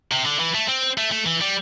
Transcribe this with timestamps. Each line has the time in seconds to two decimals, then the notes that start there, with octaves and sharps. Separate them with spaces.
0.12 C3
0.26 D3
0.40 E3
0.55 A3
0.69 C4
0.98 A3
1.12 A3
1.26 E3
1.41 G3